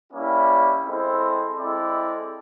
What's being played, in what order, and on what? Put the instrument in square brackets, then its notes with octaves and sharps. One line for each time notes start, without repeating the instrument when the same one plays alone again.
[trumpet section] G3 A#3 C#4 E4
G#3 C4 E4 A4 C5
G#3 C4 E4 A4 D5